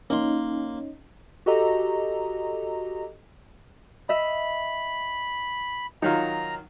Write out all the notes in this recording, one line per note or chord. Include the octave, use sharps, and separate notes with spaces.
A#3 C#4 D#4 C6
F#4 G4 A4 D#5 A#5
D#5 E5 B5
D#3 F#3 D#4 F4 A#5